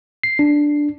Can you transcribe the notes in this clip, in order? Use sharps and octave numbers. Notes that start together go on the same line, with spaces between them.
C7
D4